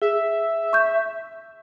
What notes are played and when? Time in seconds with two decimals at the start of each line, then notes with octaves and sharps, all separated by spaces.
0.02 G#4 E5
0.73 C#6 G6